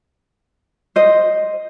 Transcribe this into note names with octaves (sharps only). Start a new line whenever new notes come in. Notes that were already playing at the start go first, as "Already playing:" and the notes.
C5 D#5